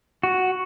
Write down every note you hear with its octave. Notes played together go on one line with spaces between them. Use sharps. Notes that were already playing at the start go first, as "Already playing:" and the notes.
F#4